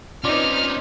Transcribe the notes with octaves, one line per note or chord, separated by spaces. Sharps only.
C4 C#4 D#4 F4 B4 D5 D6 F6